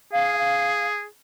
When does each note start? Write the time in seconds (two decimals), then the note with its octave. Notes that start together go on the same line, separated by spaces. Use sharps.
0.12 G#4 F5
0.38 F5